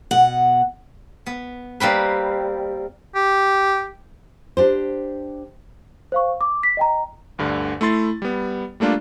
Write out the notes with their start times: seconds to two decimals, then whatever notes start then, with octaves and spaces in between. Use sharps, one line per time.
0.11 B2 F#5
1.26 B3
1.80 G3 A#3 C4 B4
3.15 G4
4.57 D4 G4 C5
6.12 C5 F5 C#6
6.41 D6
6.63 B6
6.77 D#5 G5 A#5
7.38 D2 G2 D3
7.81 A3 E4 C6 A6
8.22 G3 B3
8.80 G3 A3 A#3 D4 F4